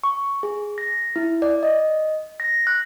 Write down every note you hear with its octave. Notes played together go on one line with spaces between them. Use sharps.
C#6
G#4
A#6
E4
D5
D#5
A#6
F#6